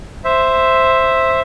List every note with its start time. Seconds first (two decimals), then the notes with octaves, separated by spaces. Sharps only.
0.24 C5 E5